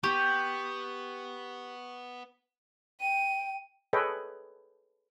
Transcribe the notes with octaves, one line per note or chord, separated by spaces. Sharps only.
B3 G4 C#6
G5 D#7
G#4 A4 B4 C#5 D#5 G5